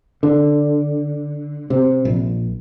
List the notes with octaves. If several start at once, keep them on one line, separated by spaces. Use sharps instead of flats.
D3
C3
A#1